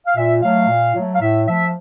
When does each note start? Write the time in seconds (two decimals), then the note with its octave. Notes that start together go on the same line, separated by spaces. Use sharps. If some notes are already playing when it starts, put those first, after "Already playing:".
0.07 F5
0.16 A#2 E5
0.42 F#3 A3 F5
0.68 A#2
0.95 F#3 A3
1.15 F5
1.21 A2 E5
1.47 F3 A3 E5